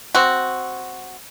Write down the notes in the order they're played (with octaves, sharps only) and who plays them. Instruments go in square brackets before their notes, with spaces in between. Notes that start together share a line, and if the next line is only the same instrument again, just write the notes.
[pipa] C4 F#4